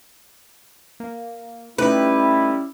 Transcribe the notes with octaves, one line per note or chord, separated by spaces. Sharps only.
A#3
G3 A3 C#4 D#4 E4 G4 B4